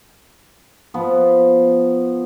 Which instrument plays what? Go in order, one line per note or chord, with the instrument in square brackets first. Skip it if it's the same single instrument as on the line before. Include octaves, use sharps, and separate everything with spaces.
[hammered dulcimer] F3 B3